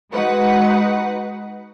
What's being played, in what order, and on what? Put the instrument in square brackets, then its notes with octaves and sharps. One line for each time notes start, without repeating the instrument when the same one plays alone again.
[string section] G#3 D#4 F#4 B4 F#5